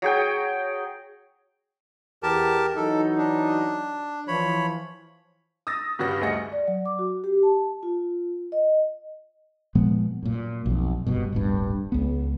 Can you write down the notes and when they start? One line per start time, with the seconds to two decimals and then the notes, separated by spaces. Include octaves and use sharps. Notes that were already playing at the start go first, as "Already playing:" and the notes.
0.02 F#3 G#4 G5
2.23 E2 G4 A#4 A5
2.76 E3 F#3 D#4 A4
3.18 D4
4.28 E3 F3 C#5 B5
5.67 D#6 E6 A6 A#6
5.99 G2 C#3 G3 F#4 A#6
6.21 D2 A3 G#4 D#5 A#6 C#7
6.52 D5
6.68 F#3
6.85 D6
6.99 F#4
7.24 G4
7.43 A5
7.83 F4
8.52 D#5
9.75 A#2 F3 G#3 B3
10.23 F#2 A#2
10.66 B1 F2
11.06 F1 G2 B2
11.33 D1 G1 G2
11.92 C#2 B3